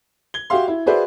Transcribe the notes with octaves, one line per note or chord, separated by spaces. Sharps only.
G#6 G7
F#4 G4 E5 F5 C6
E4
F#4 G#4 B4 C5 D5 E5